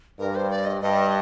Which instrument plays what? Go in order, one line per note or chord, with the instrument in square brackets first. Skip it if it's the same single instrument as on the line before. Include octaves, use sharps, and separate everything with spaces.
[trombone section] G2 [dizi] A#4
[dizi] C5
D5
D#5
[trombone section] G2 [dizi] D#5